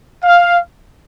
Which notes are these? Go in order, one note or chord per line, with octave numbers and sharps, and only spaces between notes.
F5